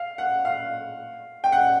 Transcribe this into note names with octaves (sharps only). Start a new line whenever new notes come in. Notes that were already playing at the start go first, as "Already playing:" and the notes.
Already playing: F5
F#5
F5
G5
F#5